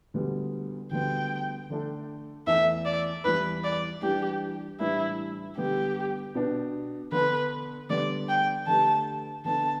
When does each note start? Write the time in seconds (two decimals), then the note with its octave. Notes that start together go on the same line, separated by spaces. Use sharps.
0.14 D2 D3 G3 B3
0.91 D2 D3 G3 B3 G5
1.70 D3 A3 D4 A4
2.47 E2 E3 A3 E4 A4 E5
2.85 D5
3.25 E2 E3 G3 E4 B4
3.64 D5
4.02 E3 G3 D4 G4 B4
4.80 A2 E3 G3 D4 E4 B4
5.57 D3 G3 B3 G4
6.35 B2 B3 D4 B4
7.12 D3 B3 D4 A4 B4
7.90 D3 G3 B3 D5
8.29 G5
8.67 D3 A3 D4 G4 B4 A5
9.45 D3 B3 D4 A4 A5